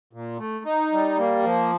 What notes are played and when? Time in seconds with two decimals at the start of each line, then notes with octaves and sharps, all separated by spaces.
0.13 A#2
0.39 A3
0.65 D#4
0.92 G3
1.18 A#3
1.44 F3